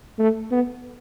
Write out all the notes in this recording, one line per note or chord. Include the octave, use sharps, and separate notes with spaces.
A3
B3